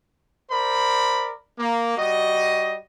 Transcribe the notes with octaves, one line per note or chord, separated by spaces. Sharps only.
A#4 C5 D5 B5
A#3
G3 F#4 D#5